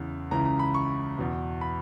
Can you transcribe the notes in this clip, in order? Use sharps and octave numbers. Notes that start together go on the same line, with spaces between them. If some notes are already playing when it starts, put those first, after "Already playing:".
Already playing: E2 C#3 E3
C#2 C#3 E3 A#5
A#5
B5
C#6
E2 B2
B5